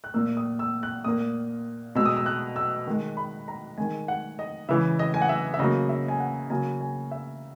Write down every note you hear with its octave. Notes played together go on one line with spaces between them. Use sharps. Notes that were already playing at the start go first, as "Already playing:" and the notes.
F#6
A#2 A#3 E6
D#6
E6
F#6
A#2 A#3 D#6
B2 G#3 E6
D#6
E6
F#6
E6
D#3 G#3
B5
A#5
D#3 G#3 G#5
F#5
D#5
C#3 E3 G#3 E5
D#5
G#5
F#5
E5
E5
C#3 F#3 A#3 D#5
E5
G#5
F#5
C#3 F#3 A#3 G#5
G#5
E5